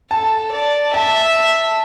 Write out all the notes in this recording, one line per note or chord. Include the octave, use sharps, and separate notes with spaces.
A4 A5
D5
E5 A5